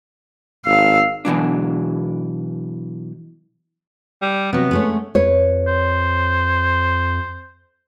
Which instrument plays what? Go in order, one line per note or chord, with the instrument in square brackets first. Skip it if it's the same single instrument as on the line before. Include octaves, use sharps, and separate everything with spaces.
[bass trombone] G#1 [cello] F5 [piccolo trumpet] E6
[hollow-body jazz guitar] B2 E3 F#3 D4
[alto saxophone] G3
[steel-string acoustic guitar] C3 F#3 [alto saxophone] B3
[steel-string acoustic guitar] G#3 A3 C#4
[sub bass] F2 [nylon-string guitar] B4 C#5
[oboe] C5